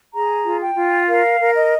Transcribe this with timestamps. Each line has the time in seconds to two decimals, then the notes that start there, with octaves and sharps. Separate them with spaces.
0.13 G#4 A#5
0.45 F4
0.60 G5
0.76 F4
1.07 A#4 F5
1.39 A#4
1.55 D#5